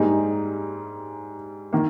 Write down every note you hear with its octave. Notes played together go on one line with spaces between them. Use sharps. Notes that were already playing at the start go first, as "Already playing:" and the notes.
Already playing: G#2 G3 A#3 D#4 G#4
D#3 A#3